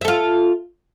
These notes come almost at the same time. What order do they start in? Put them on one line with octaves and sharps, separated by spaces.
E5 A4 F4